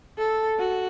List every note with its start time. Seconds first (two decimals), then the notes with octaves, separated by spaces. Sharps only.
0.18 A4
0.59 F#4